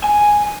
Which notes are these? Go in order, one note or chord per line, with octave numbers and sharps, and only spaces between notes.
G#5